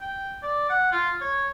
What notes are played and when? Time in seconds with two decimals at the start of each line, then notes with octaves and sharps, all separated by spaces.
0.01 G5
0.43 D5
0.70 F#5
0.92 F4
1.21 C#5